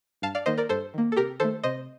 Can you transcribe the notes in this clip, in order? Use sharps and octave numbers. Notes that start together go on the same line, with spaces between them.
G2 F5 A5
D5 F5
D#3 A#3 C5 D#5
A#4 D5
G2 A4 C5
D#3 A#3
A4
C3 G4 A#4
D#3 A3 A4 C5
C3 C5 D#5